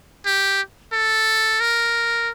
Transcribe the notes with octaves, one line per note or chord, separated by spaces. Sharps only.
G4
A4
A#4